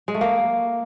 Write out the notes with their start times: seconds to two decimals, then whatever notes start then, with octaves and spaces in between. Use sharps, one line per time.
0.08 G#3
0.14 A3
0.21 A#3